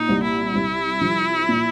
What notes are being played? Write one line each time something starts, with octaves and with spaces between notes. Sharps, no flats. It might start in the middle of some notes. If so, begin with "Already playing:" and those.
Already playing: A#2 D#4
C2
E4
C2
F3
A#2